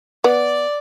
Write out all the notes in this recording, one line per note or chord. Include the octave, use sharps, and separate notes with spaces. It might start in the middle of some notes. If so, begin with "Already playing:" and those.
B3 D5